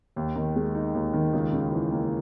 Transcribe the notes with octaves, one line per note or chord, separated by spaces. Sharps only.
D#2
D#3
G#3
D#4
D#2
D#3
C#2
C#3
E3
A#3